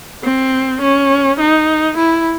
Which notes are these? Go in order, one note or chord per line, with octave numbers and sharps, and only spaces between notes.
C4
C#4
D#4
E4